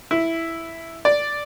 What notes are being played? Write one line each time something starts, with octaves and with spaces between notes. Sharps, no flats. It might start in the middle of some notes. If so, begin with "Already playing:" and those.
E4
D5